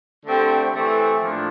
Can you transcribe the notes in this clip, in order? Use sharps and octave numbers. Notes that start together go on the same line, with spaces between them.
D3 A3 C4 G4
E3 A3 C4 G4
A2 F3 A#3 D4